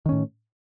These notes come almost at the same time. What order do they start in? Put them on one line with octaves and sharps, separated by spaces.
D#3 C#4 A2